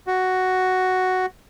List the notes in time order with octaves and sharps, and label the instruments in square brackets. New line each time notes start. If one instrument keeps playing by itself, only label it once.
[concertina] F#4